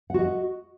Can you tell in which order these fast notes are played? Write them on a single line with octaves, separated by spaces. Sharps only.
F#5 F#4 D#5